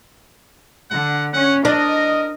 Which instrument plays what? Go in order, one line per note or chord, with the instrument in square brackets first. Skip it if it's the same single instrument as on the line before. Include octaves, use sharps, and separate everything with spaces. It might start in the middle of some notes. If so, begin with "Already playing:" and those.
[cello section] D3 [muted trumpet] F#5
[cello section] C#4 [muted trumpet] F#5
[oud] D4 [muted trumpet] A#4 [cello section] D#5